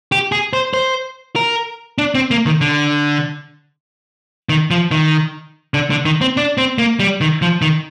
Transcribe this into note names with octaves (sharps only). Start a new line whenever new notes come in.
G4
G#4
C5
C5
A#4
D4
C4
A#3
D#3
D3
D#3
F3
D#3
D3
D3
D#3
C4
D4
C4
A#3
G3
D#3
F3
D#3